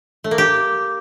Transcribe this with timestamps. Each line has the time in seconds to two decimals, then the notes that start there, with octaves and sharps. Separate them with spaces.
0.24 A3
0.31 A#3
0.38 G4